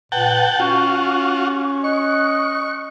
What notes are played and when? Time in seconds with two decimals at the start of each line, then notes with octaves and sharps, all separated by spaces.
0.12 A#2 B4 F#5 G5 A5
0.60 C#4 F4 F#4 C#6
1.84 D#5 C#6 F#6